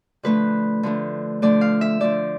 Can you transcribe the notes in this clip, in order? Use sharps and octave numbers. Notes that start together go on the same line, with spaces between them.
D3 F3 A3 B4
D3 F3 A3
D3 F3 A3 D5
F5
E5
D3 F3 A3 D5